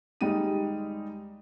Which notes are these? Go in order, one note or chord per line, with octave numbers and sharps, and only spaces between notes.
D#2 G3 G#3 D#4 D#7